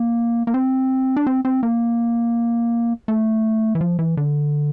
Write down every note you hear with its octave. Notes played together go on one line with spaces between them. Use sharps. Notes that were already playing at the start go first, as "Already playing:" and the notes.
Already playing: A#3
A#3
C4
D4
C4
C4
A#3
A3
E3
F3
E3
D3